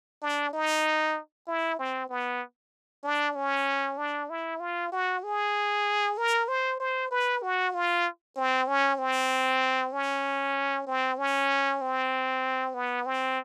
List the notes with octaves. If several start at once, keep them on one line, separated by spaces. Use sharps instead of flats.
D4
D#4
E4
C4
B3
D4
C#4
D4
E4
F4
F#4
G#4
A#4
C5
C5
B4
F#4
F4
C4
C#4
C4
C#4
C4
C#4
C4
B3
C4